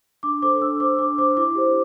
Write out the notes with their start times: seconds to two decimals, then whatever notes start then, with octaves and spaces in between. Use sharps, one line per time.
0.23 D4 D6
0.42 A4 C5 D6
0.61 D4 E6
0.80 C5 D6
0.99 D4 D6
1.18 C5 D6
1.37 E4 D6
1.55 G4 C5